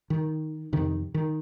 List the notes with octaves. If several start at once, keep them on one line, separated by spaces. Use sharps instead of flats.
D#3
F2 C3 D#3
D#3